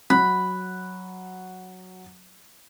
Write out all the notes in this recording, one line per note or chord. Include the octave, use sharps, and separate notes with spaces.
F#3 B5 F#6